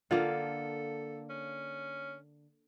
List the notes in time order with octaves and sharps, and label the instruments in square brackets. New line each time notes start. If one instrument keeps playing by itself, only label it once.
[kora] D3 A#3 [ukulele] F4 [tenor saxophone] A4
[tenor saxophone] C#4